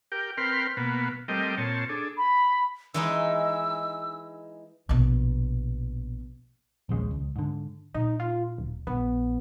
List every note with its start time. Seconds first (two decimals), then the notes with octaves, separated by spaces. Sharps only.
0.12 G4 A#4 G5
0.38 C4 A#4 B4 G5 C6 F6
0.77 B2 A#3 B3
1.28 G3 A3 C4 A#4 D#5 G5
1.58 A#2 C4 C#5 A5
1.89 D4 G#4 A4
2.17 B5
2.94 E3 G#3 D#4 E6
4.89 A#1 B2
6.89 A#1 D#2 G#3 C#4
7.11 C#2
7.36 G#2 D3
7.95 A#2 D#4
8.20 F4
8.58 D1
8.87 A#1 B3